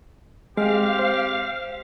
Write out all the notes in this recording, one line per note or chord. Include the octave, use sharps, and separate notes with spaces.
G#3 C4 G4 F5
C5